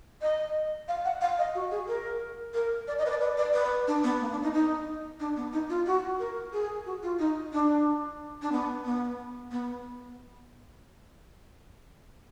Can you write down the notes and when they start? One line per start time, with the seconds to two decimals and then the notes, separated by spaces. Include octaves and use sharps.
0.22 D#5
0.88 F5
1.05 F#5
1.21 F5
1.38 D#5
1.55 F#4
1.71 G#4
1.88 A#4
2.54 A#4
2.88 D5
2.98 D#5
3.06 B4
3.10 D5
3.21 B4
3.37 D5
3.54 B4
3.87 D4
4.04 B3
4.20 A#3
4.31 D4
4.43 D#4
4.53 D#4
5.20 D4
5.36 B3
5.53 D#4
5.69 F4
5.86 F#4
6.19 A#4
6.53 G#4
6.86 F#4
7.03 F4
7.19 D#4
7.53 D4
8.42 D4
8.52 B3
8.85 B3
9.51 B3